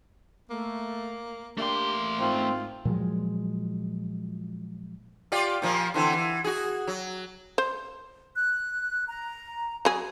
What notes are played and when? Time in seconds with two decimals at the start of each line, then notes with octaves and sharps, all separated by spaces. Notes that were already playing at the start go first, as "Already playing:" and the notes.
0.50 A3 A#3
1.58 A3 A#3 D4 G4 C6
2.20 G#2 C4 F4
2.85 A#2 F3 F#3 G#3
5.32 F4 G4 D5
5.62 A#2 F3 A#3
5.94 D3 E3 C4
6.13 E3
6.44 F#4 G#4
6.87 F#3
7.58 C5
8.36 F#6
9.08 A#5
9.85 F#3 G#4